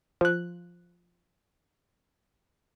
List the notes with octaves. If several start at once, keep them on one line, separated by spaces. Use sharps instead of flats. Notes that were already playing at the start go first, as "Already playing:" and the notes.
F3 F#6